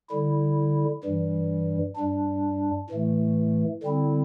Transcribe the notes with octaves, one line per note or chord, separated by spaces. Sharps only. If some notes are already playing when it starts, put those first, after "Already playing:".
D3 G3 E4
G2 E3 G3
G2 G3 D4
A2 E3 A3
D3 G3 C4 E4